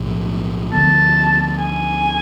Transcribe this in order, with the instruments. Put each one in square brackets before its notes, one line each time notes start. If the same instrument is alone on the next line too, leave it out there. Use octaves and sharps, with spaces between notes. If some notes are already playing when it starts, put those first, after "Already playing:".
Already playing: [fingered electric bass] B1 A2 F3 B3
[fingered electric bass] D2 D3 F3 B3 [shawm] A5
[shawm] G#5